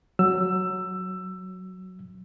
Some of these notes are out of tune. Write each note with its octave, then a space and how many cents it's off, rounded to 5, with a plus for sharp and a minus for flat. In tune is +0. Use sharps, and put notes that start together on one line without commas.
F#3 +0 E6 +15